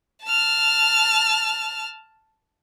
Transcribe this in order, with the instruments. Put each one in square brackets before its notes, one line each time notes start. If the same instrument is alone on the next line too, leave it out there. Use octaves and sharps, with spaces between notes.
[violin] A5 F6